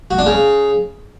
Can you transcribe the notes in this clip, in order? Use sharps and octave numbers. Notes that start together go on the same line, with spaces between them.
F#4
D4
C#3